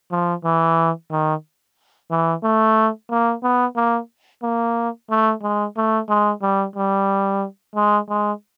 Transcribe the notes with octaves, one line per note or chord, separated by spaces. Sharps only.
F3
E3
D#3
E3
A3
A#3
B3
A#3
A#3
A3
G#3
A3
G#3
G3
G3
G#3
G#3